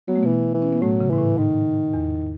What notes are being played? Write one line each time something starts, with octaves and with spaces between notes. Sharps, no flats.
F#3 B3
A3
B2 E3 B3
E3
C#4
B3
A2 F#3 A3
C#3
G#2 E3
A2
G#2 D#3
E2